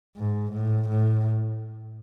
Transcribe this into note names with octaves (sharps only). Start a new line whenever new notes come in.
G#2
A2
A2